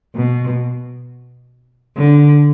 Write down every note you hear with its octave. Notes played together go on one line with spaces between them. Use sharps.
B2
D3